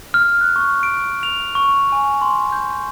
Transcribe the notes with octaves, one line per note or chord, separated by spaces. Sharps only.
F6
F#6
C#6
D7
F7
C#6
G#5
C6
G6